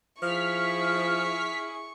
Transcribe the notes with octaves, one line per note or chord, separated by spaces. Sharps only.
F3 E4 G#4 C#6 F6 B6